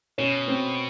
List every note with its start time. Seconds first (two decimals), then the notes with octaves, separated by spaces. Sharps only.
0.18 B2 C#4
0.48 C4